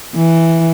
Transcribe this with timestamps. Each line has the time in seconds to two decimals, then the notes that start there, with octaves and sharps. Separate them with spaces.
0.15 E3